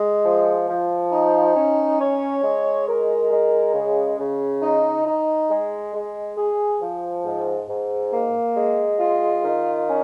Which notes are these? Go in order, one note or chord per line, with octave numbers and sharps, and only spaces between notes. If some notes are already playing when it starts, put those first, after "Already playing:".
Already playing: G#3
F3
F3
D#4
C#4
C#5
G#3
A#4
G#3
C#3
C#3
D#4
D#4
G#3
G#3
G#4
F3
G#2
G#2
A#3
G#3
F4
D#3
C#4